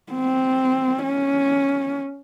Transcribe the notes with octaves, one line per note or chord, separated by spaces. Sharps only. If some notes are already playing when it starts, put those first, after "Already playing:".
C4
C#4